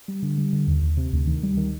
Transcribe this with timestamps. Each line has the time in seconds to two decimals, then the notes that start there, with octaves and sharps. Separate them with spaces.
0.08 G3
0.23 D3
0.38 G3
0.53 D3
0.67 D#2
0.82 D#2
0.97 C3
1.13 D2
1.27 D#3
1.43 G3
1.57 D#3